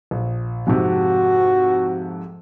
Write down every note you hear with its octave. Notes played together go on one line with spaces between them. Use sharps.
A#1
F2 G#2 C3 F#4